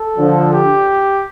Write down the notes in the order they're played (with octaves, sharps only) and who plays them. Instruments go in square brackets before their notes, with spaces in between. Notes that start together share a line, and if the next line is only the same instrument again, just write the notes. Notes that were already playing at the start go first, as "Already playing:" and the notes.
Already playing: [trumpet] A4
[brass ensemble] D3 F3
[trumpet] G4